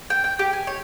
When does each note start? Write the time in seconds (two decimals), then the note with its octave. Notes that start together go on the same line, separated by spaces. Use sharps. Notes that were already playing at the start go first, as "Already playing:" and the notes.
0.10 G5
0.24 G5
0.39 G4
0.53 G#5
0.67 C#5